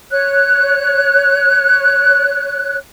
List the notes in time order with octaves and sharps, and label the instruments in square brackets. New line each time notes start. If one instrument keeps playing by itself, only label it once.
[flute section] C#5 F#6